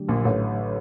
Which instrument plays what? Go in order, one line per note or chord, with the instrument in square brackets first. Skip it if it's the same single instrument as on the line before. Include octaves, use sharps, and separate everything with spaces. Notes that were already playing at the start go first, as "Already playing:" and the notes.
Already playing: [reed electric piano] D3 F#3 A3 D4 G4
[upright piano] A#1 A#2
A1 A2